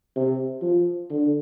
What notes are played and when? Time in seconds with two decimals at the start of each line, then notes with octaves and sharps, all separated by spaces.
0.16 C3
0.62 F3
1.10 D3